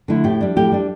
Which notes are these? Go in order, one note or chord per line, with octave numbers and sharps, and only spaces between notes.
D3 A3 E4
A2 G4
G3 D4
A2 G4
G3 D4